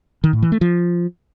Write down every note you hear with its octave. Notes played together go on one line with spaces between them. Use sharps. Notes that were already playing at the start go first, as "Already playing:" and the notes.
D#3
A2
E3
A3
F3